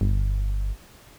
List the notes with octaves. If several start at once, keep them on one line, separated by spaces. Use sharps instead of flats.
G1